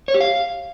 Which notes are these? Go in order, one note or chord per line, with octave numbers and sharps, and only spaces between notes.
C#5
G4
F5